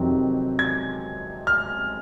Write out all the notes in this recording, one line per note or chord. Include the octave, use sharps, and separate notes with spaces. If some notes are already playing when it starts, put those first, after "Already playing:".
Already playing: F2 C3 D#3 F#3 C4
G#6
F6